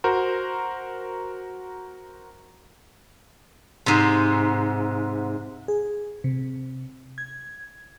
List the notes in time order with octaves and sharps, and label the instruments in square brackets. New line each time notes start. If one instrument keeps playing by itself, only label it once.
[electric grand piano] F#4 A#4 C5
[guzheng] G#2 C3
[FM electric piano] G#4
C3
G#6